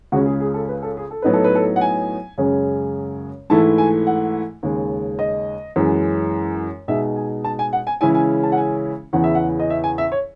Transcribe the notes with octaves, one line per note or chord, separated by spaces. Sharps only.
C#2 C#3 G#3 C#4 F#4
G#4
G#4
A4
B4
A4
G#4
A4
A2 F#3 B3 D#4 B4
A4
B4
A4
F#5
G#5
F#2 C#3 G#3 C#4
G#2 E3 A3 E4 A5
G#5
F#5
D#2 C#3 G#3
D#5
F#2 E3 G#3
B2 G#3 D#4 E5
G#5
A5
G#5
F#5
G#5
C#3 E3 G#3 C#4 E4 G#5
G#5
A5
F#5
G#5
E2 C#3 E3 B3 F#5
E5
F#5
D#5
E5
G#5
E5
C#5